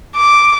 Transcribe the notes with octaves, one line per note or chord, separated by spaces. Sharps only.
D6